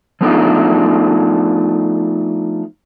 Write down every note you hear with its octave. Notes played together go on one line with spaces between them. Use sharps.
F3 A3 B3 D4 D#4 F4